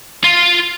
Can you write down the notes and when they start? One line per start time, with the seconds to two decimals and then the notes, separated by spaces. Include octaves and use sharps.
0.24 F4